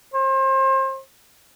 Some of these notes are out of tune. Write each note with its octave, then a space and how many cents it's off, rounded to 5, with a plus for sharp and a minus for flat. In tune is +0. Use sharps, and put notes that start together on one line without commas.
C5 +35